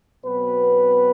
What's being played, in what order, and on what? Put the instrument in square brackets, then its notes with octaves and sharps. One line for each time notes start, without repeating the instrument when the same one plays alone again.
[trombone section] B2 F#3 B3 C4 B4